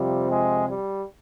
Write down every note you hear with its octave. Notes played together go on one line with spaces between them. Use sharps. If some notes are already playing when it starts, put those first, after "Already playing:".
Already playing: F2 C3 F3 G3
G#3
G3